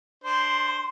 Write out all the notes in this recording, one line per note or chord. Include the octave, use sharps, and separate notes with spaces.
D4 C5 C6